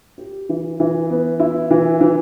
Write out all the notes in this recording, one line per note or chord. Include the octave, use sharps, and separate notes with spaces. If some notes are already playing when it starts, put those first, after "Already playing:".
G4
E3
E3
B3
E4
E3
E3